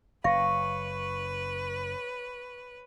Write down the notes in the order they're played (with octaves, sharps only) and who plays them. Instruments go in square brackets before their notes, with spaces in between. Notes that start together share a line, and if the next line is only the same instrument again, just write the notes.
[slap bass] F#1 [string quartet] B4 [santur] C#5 [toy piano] F5